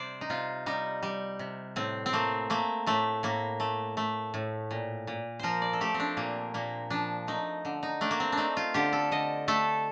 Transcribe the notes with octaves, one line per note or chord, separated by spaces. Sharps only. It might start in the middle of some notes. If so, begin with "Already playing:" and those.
Already playing: C3 G3 C5 D5
D#4
C3 F4
G3 D#4
G3
C3
A2 C4
C4
A3 A#3
A3 A#3
A2 A3
A2 A#3
A3
A3
A2
A#2
A#2
F3 A#4 C5
D5
A4
A3 G4
C4
D4
A#2 A#3
A#2 A#3
F3 D4
A3 D#4
D3
D#4
A3 D4
A#3
C4
D4
A3 D#4
F4
D3 G4
A4
D3 D#5
A3 A4